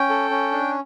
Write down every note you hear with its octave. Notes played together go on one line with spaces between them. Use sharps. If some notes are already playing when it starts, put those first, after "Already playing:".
Already playing: C#4 G5
A4
C#4
D4